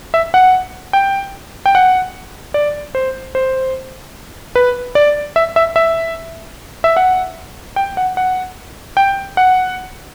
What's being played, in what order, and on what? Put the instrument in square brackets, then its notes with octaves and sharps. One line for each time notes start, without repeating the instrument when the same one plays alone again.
[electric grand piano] E5
F#5
G5
G5
F#5
D5
C5
C5
B4
D5
E5
E5
E5
E5
F#5
G5
F#5
F#5
G5
F#5